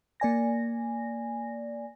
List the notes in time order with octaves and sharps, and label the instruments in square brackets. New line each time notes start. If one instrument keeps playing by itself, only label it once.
[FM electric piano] A#3 D5 G#5 A#6